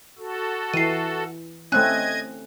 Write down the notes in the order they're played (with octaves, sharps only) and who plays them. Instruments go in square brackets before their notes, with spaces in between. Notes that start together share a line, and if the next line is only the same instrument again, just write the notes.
[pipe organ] F#4 A4
[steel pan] E3 [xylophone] C7 D#7
[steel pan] A3 C4 C#4 [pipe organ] D#5 G#6 [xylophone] G#5 F#6